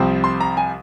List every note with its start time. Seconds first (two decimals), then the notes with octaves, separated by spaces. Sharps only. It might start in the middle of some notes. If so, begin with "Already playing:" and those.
Already playing: C2 C3 F3 C4
0.24 C6
0.41 A#5
0.57 G#5